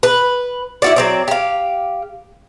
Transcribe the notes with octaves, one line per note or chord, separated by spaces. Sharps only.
B4
E4 F#4 D5
F#3 C4 D5
G4 F5